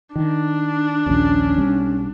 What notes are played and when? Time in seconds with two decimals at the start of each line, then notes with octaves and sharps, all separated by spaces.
0.16 D#3 D4
1.06 A#1 D#2 C#4
1.57 B1 G3 C4